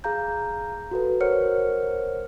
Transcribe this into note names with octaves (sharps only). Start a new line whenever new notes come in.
G#4 F5 A#5 G6
F#4 A4 B4
A#4 C5 C#5 F#5 F6 C#7